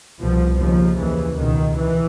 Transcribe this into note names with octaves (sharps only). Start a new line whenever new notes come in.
C2 B2 F3
D#2 C#3 F3
D#2 C#3 E3
C#2 B2 D#3
E3